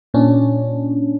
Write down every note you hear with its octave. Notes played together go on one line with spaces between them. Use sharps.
A#2 C#4 D4